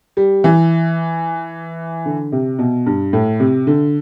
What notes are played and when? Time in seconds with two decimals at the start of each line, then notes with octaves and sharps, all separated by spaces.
0.17 G3
0.44 E3
2.06 D3
2.32 C3
2.59 B2
2.86 G2
3.13 A2
3.40 C3
3.67 D3